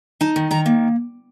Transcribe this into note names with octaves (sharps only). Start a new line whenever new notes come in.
D#4 A5
D#3
D#3 A#5
A#3